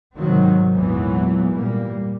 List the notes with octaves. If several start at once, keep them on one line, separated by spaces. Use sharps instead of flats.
G#2 C3 D#3 F#3 C4
G#1 E2 A#2 E3 F#3 B3
A#2 G3 A#3